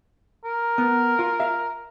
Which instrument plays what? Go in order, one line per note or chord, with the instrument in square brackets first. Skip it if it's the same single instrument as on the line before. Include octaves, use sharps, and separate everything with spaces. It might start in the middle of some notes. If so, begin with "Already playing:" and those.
[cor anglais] A#4
[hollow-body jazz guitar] B3
F4
E5 F5